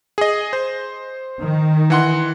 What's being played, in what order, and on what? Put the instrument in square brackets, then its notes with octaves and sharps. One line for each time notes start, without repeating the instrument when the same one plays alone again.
[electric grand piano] G#4 D#5
C5
[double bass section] D#3
[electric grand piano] E3 F#5 C6